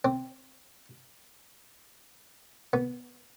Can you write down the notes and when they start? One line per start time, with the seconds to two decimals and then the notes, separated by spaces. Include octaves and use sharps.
0.05 C4
2.73 B3